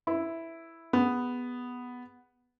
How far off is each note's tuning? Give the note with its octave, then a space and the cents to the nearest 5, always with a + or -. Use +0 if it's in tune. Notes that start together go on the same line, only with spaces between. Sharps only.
E4 +0 B4 +0
B3 +0 G#4 -20